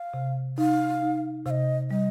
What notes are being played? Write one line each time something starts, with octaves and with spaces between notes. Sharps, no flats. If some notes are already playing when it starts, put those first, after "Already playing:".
Already playing: F5
C3
D#4 F5
D#4
C3 D#5 F5
G3 D#5